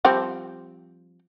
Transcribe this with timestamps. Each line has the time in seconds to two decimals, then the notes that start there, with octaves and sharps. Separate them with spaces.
0.05 F3 G3 C4